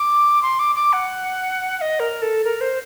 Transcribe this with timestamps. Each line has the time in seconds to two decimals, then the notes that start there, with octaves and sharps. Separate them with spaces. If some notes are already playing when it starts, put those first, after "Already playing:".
Already playing: D6
0.42 C6
0.59 D6
0.75 D6
0.93 F#5
1.77 F#5
1.81 D#5
2.00 A#4
2.22 A4
2.44 A#4
2.61 C5